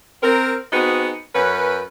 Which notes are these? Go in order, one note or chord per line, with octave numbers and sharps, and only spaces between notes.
C4 A#4
B3 C4 D#4 F#4 G#4
F#2 C#4 B4